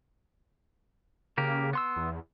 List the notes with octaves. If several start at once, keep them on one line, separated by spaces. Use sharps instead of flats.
C#3 A#3 G4 A#4
B3 C6 E6
E2